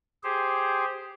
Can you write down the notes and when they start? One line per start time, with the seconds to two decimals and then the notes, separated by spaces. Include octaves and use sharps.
0.24 G4 G#4 C5